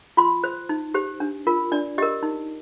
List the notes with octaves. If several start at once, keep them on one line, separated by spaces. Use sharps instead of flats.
F4 C6
C5
D#4
G4 C5
D4
F4 A#4
D4 D5
G4 A#4 D#5
D#4